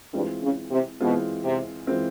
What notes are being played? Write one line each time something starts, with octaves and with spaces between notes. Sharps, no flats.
G2 E3 G#3 C4 F4
C#3
C3
B2 E3 G#3 C4 F4
C3
E3 G#3 C4 F4